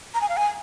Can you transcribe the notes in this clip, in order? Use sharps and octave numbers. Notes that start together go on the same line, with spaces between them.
A#5
G#5
F5
G#5